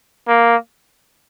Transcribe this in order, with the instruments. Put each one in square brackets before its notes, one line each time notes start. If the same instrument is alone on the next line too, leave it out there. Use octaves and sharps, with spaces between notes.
[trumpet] A#3